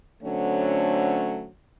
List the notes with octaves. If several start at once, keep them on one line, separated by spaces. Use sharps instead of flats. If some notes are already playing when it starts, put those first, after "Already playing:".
D3 F#3 A3 C4 C#4